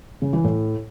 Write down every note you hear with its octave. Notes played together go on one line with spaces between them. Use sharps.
C#3
E3
A2